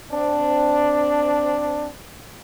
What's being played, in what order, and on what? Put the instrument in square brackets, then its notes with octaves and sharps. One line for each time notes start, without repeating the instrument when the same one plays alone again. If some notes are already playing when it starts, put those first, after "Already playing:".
[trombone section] C4 D4